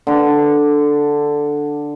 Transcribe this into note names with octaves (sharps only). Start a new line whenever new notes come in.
D3 D4